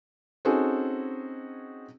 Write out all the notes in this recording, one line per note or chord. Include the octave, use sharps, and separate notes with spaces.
C4 C#4 D#4 F#4 G#4 A4